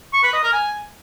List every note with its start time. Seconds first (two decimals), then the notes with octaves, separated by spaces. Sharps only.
0.13 C#6
0.23 B4
0.33 D#5
0.43 A#4
0.53 G#5